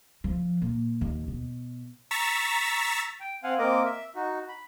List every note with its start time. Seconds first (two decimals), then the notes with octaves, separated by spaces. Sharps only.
0.24 F3
0.62 A#2
1.01 D#2
1.28 B2
2.11 A#5 C#6 E6 A6 B6
3.20 G5
3.44 C4 F5 F#5 G#5
3.59 A#3 C4 A#4 D#5 D6
3.86 E5
4.15 D#4 F#4
4.49 B5